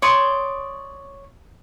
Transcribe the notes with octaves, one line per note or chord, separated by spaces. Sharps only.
C#5 D5 C6 D#6